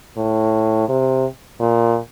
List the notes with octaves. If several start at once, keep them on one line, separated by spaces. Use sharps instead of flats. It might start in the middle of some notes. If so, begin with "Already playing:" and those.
A2
C3
A#2